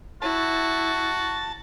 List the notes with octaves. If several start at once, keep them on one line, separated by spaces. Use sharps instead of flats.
E4 F#4 A5